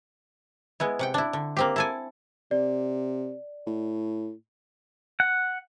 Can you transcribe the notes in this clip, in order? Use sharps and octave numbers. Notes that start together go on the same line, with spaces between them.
G#3 B3 E4
C3 F#5 G5
D4 E4
D3
A#3 C4 G4
E4 A4 G#5
C3 D5
A2
F#5